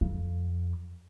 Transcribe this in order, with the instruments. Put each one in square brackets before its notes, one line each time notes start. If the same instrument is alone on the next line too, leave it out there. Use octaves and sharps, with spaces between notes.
[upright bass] F2